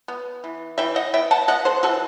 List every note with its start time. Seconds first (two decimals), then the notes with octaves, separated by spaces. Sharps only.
0.08 B3
0.44 E3
0.78 E3 E5 G5
0.96 D#5 F#5
1.14 B3 E5 G5
1.31 F#5 A5
1.48 B3 D#5 F#5
1.65 A4 C5
1.83 E3 F#4 A4